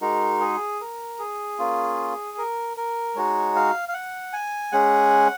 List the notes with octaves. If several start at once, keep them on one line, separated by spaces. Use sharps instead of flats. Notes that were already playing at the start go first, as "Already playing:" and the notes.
G#3 D#4 F#4 A#4
G#4
A#4
G#4
A#3 C#4 F4
A#4
A#4
G#3 D#4 F#4 C#5
F5
F5
F#5
G#5
G#3 C#4 G#4 F#5